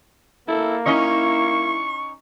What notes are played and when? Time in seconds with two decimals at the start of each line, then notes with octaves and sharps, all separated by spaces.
0.48 A#3 E4 A4
0.86 C#4 D#4 E4 D#5 C#6